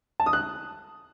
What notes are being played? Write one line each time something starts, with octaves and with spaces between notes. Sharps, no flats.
A5
D#6
F#6